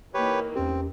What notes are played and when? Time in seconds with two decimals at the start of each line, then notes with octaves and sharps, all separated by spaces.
0.14 E3 A#3 D#4 G4 B4 C#5
0.56 E2 C4 C#4 G4